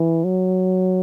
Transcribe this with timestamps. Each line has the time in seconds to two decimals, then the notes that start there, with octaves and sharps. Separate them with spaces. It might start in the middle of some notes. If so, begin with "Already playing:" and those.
Already playing: E3
0.24 F#3